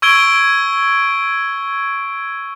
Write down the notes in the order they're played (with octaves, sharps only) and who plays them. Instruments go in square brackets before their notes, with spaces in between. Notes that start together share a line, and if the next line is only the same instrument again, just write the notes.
[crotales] C#6 E6 G#6 D7 G7